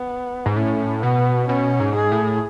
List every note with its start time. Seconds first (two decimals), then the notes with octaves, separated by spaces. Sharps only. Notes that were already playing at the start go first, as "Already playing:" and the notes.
Already playing: B3
0.46 G#2
0.55 A2 C#4
1.03 B2 B3
1.49 B2 C#4
1.80 G#2
1.96 G#4
2.12 A2